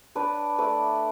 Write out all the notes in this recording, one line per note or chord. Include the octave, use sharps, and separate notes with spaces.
D4 B4 D5
A3 B4 D5